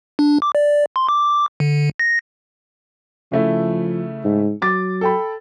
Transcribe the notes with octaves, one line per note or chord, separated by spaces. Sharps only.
D4
D6
D5
C6
D6
D3
A#6
C#3 F3 A3 E4
G#2
F#3 D6 A6
A4 G5 B5